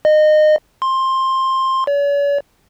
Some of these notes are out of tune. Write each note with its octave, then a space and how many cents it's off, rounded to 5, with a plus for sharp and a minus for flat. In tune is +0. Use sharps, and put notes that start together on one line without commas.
D#5 -25
C6 +15
C#5 +45